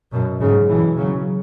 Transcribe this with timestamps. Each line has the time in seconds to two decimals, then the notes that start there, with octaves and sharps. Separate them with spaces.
0.12 F#2 B2
0.40 G#2 C#3
0.69 B2 E3
0.98 C#3 F#3